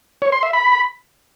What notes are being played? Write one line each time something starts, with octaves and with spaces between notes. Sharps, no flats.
C#5
C6
E5
B5